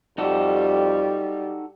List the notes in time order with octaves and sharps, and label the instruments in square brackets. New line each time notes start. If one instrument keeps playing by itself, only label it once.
[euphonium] F2 [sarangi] G3 [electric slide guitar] D#4 F#4 A4